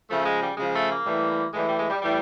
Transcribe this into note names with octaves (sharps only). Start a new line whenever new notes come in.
C#3 F3 A3
G#3
G3
C#3 F3 G#3
A3
A#3
A2 E3 G3
A2 E3 G3 G#3
G3
G#3
G3
A2 E3 G3